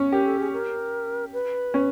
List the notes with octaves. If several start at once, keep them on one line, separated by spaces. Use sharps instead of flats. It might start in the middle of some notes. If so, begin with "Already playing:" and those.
Already playing: C#4
G4 A#4
A4
G#4
A#4
B4
C#4